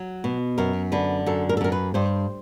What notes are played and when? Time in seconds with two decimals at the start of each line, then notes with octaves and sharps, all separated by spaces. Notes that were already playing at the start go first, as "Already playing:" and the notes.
Already playing: F#3
0.24 B2
0.58 F#2 A#4
0.92 D3 B4
1.26 F#2 A4
1.49 A#4
1.57 A4
1.61 F#2 A#4
1.72 B4
1.94 G2 C5